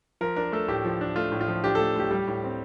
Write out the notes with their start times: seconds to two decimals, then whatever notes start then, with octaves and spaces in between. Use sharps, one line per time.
0.21 F3 A#4
0.36 D4 A#4
0.52 A3 A4
0.68 A2 G4
0.84 F3
1.01 D4
1.16 A3 F4
1.32 A2
1.41 F4
1.48 F3
1.64 D4 G4
1.75 A3 A4
1.96 A2 G4
2.11 G3
2.28 A2
2.44 C4